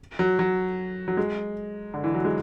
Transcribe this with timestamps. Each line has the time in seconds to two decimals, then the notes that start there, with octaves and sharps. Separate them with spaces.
0.19 F#3
0.39 F#3
1.08 F#3
1.17 G#3
1.94 D3
2.04 E3
2.14 F#3
2.25 G#3